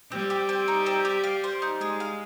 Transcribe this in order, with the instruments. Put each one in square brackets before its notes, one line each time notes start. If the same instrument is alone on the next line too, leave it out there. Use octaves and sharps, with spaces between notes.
[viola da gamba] G3 [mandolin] C4
[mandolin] G4
C4
D#4
C4
G4
F5
C5
D#4
[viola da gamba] G#3 [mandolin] G#4
[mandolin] F5